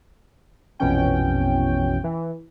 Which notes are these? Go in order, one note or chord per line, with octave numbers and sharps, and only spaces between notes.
A#1 F2 B2 E3 C#4 G5
E3